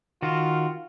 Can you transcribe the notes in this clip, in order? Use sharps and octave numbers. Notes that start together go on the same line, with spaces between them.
D#3 F4 F#4